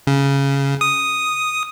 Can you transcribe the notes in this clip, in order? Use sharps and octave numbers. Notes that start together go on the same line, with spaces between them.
C#3
D#6